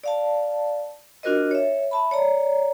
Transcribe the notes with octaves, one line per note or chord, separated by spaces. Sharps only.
D5 F5 A5
D4 F4 F#4 A#4 C5 D#5
C#5 E5
E5 A5 B5
C#5 D5 A#5